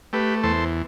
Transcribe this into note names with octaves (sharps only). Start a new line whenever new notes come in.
A3 G4 B4
E2 A4 C5